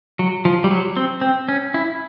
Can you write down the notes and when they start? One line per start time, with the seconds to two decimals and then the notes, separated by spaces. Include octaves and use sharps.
0.19 F#3
0.45 F3
0.64 G3
0.71 F#3
0.97 C4
1.21 C4
1.49 C#4
1.74 E4